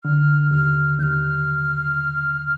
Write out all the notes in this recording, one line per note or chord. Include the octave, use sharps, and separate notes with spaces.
D3 F6
D#2 F6
D#2 F6 G6